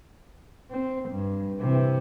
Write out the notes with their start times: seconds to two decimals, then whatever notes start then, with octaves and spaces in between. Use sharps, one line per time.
0.71 C4
1.09 G2
1.61 C3 E3